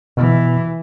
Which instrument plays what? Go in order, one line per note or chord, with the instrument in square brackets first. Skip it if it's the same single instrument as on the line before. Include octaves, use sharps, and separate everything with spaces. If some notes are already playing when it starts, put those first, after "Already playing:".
[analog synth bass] B2 [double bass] E3